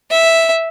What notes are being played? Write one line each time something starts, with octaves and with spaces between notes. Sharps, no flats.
E5